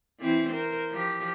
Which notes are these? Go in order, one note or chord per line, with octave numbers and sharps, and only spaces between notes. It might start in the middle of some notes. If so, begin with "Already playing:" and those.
E3 C4 E4
A#4 C5
F3 G4